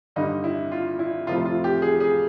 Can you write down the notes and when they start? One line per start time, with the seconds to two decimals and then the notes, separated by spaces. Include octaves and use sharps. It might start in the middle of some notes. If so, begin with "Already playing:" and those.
0.16 G2 D3 G3 D#4
0.44 E4
0.72 F4
0.99 E4
1.27 F2 C3 F3 A3 F4
1.45 F4
1.64 G4
1.82 G#4
2.00 G#4